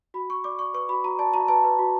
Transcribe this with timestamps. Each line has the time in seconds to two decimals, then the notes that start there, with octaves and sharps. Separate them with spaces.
0.14 F#4 B5
0.30 F#4 C#6
0.44 D5 D6
0.59 D5 C#6
0.74 B4 C#6
0.89 F#4 B5
1.04 F#4 A#5
1.19 D5 A5
1.34 F#4 A#5
1.48 B4 A5
1.64 B4
1.79 F#4